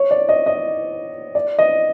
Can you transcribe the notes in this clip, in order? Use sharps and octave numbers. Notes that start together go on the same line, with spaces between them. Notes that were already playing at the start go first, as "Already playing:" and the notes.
Already playing: C#5
D5
D#5
D#5
D5
D#5